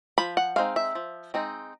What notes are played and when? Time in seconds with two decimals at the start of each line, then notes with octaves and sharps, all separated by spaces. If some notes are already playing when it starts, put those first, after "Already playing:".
0.18 F3 B5
0.37 F#5
0.56 G#3 C4 D#4 F5
0.76 E5
0.95 F3
1.34 G#3 C4 D#4